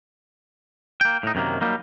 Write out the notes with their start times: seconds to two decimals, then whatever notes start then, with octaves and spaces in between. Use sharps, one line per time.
1.01 A#3 G5
1.23 A2 D#4
1.35 F#2 C3 D#3 A#3
1.61 F#3 G3 A#3 D#4